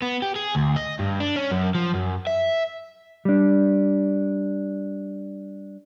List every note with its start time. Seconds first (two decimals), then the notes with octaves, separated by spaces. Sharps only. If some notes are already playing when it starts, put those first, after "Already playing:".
0.02 B3
0.22 G4
0.36 G#4
0.55 D2
0.76 D#5
0.99 G2
1.20 D4
1.36 C#4
1.51 F#2
1.75 F3
1.94 F#2
2.27 E5
3.25 G3 D4